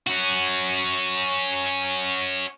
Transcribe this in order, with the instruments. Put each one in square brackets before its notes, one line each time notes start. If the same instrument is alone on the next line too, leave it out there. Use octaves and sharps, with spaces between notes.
[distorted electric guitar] C#4 F#4